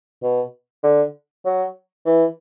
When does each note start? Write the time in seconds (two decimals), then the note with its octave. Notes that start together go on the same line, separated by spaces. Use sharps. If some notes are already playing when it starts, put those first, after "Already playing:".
0.23 B2
0.84 D3
1.45 F#3
2.06 E3